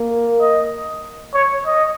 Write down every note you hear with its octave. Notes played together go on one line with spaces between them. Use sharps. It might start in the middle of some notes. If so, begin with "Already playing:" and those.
Already playing: A#3
D#5
C#5
D#5